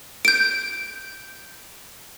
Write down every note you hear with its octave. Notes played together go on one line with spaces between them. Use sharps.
G6 D7